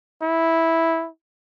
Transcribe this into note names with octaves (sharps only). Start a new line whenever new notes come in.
E4